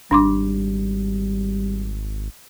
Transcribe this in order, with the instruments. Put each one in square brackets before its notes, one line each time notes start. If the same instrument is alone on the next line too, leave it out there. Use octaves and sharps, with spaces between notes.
[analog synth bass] G#1 [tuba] G3 [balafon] D4 C6 D6